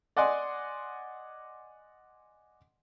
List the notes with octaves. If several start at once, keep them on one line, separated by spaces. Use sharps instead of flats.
D5 D#5 F#5 G#5 C6 D6